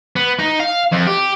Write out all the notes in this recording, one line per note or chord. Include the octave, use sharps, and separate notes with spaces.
B3
D#4
F5
F2
G4